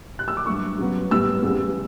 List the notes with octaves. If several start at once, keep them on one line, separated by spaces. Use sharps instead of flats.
F#6
E6
D6
G2 F#3 A3 C#6
C#3 F#3 B3
A2 G3 B3 E6
E2 C#3 G3 B3